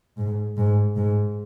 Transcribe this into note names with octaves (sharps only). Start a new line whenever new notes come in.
G#2
G#2
G#2